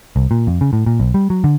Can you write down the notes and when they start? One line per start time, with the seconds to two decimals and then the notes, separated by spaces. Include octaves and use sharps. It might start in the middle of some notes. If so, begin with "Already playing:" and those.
0.16 C2
0.31 A#2
0.47 F2
0.61 C#3
0.73 A2
0.86 A#2
1.00 B1
1.14 G3
1.30 F#3
1.44 D3